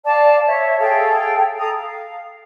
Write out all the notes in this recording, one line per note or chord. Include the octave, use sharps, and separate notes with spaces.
D5 F5 A5
C#5 E5
G#4 A4 F5 G5
A4 A#5 D#6
F5